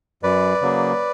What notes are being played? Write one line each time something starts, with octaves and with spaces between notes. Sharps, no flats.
F#2 B4 D5
C#3 F#3 A#3